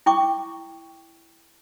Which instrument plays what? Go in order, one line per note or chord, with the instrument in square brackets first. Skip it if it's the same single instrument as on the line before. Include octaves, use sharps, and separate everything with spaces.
[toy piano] E4 G5 C#6 D6